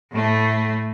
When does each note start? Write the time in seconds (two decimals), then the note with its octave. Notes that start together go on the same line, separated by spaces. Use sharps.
0.12 A2 A3